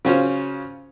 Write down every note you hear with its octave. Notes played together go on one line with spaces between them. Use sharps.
C#3 F#3 C#4 F4 C5